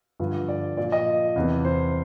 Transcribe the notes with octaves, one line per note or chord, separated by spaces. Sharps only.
G2 D3 F3
D5
A#2 F3 D5
D#5
E2 C3 E3
C5